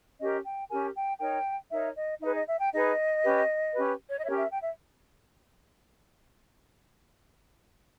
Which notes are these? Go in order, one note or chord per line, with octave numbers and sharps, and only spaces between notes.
C#4 G4 A#4 D#5
G5
C#4 G4 A#4 G#5
G5
D#4 A#4 C#5 G5
D#4 A#4 C#5 E5
D#5
D#4 G#4 B4 E5
D#5
E5
G5
D#4 G#4 B4 D#5
C#4 G4 B4
C#4 G4 B4
C#5
D#5
C#4 G4 A#4 C#5 E5
E5
G5
E5